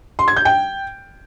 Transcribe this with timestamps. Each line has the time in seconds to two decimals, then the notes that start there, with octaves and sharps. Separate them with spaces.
0.19 C6
0.28 G#6
0.36 G6
0.45 G5